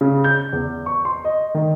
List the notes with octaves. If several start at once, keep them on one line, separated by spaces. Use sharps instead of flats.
C#3
G6
E2
C#6
C6
D#5
D#3